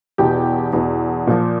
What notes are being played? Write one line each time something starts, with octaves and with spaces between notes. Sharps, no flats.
E2 B2 G4
E2 B2
A#2 F3